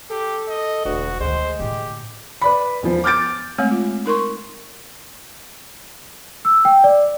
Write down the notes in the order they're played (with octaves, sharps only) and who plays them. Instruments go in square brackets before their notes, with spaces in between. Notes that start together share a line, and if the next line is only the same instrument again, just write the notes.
[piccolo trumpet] G4 [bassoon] A4
[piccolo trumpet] D#5
[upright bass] E1 [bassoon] D2 [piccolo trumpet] F#4
[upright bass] D2 D#3 [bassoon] G#3 [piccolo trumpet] C5
[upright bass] A2 D3 [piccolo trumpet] G4
[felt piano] B4 D5 B5
E1 F3
D6 F6 G6 A6 D7
[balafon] G#3 A3 C4 C#5
F4
D#4 A#4 C6 C#6
[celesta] E6
G5
D5